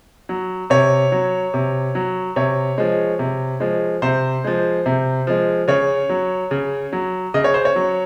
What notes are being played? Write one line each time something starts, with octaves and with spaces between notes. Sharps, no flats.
F#3
C3 C#5
F#3
C3
F#3
C3 C#5
F3 G#3
C3
F3 G#3
C3 C5
F3 G#3
C3
F3 G#3
C#3 C#5
F#3
C#3
F#3
C#3 D#5
C#5
C5
C#5
F#3